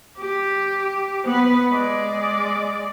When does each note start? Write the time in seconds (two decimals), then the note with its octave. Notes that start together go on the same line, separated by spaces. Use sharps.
0.18 G4
1.25 B3 B4
1.71 G#3 D5